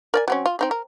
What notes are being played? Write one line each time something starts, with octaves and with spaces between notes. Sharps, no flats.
A#4 D5 G#5
F#3 C4 C#4
F4
C4 D#4 G#4
A#4